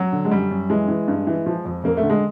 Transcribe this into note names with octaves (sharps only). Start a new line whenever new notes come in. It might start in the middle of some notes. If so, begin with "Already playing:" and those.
Already playing: F#3
D3
G#3
F#2 G3
F#2
E3 G#3
E3
G2
E3
F3
F2
F2 A#3
A3
D3
G#3